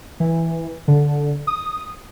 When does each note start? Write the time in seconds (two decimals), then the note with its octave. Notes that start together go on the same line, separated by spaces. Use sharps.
0.20 E3
0.88 D3
1.47 D#6